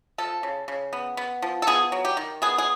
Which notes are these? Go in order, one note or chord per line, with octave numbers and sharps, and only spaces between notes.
F3 A4
C#3
C#3
B3
B3
F3
A4
B3 G#4
F#3
G4
D#3
B3 G#4
G#4